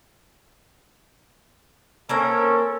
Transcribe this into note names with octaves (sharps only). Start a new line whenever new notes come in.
A#3 C4 C#4 A4 A#4